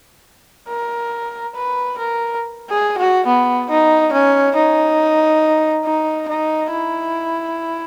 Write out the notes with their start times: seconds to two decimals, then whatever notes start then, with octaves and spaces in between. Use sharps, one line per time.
0.69 A#4
1.56 B4
1.98 A#4
2.70 G#4
2.98 F#4
3.27 B3
3.70 D#4
4.13 C#4
4.56 D#4
5.85 D#4
6.29 D#4
6.72 E4